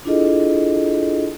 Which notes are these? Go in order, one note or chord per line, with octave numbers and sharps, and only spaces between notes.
D4 E4 F4 G#4 A4 D#5